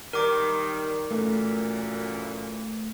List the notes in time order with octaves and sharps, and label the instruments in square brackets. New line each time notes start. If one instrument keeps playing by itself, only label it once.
[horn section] D#3 G3 [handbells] A#4 D6
[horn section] F#2 A#2 E3 [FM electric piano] A3